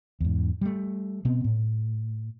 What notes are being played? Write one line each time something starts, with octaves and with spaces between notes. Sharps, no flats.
E2 G#2
G3 A3
B2 B3 C4
A2